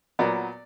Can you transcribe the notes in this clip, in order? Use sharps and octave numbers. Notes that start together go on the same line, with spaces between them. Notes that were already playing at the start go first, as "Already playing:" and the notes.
A#2 F#3 B3 D5